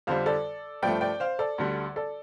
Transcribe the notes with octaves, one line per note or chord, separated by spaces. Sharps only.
F2 D3 G3 C5 F5
A4 D5
G2 F3 A3 D5 G5
D5 G5
C5 F5
A4 D5
D2 D3 G3
A4 D5